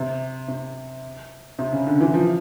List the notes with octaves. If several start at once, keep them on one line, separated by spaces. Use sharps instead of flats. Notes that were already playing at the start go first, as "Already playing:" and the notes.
Already playing: C3
C3
C3
C#3
D3
E3
F3